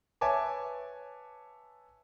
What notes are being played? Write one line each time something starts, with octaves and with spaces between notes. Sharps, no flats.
B4 C#5 E5 G#5 A5 D6